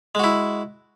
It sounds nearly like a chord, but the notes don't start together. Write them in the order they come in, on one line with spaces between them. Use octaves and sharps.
G#3 F#4 E4